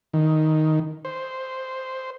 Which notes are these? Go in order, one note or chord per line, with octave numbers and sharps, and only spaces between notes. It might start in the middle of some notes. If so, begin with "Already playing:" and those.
D#3
C5